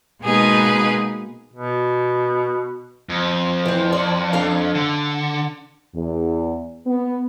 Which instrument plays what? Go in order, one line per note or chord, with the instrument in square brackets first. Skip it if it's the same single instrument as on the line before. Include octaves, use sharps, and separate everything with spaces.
[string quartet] B2 G#3 A#3 D#4 G#4 B4
[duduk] B2
[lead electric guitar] F2
[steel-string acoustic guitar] E3 C4
D5
D4 A4 F5
[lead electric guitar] D3
[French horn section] E2
B3